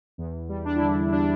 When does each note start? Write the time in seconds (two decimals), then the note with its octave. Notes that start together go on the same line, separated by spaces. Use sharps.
0.18 E2
0.49 G3
0.65 D4
0.76 D3 E4
0.88 D4
1.12 D4